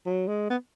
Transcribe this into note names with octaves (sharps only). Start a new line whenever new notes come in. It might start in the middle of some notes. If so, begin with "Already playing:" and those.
F#3
G#3
B3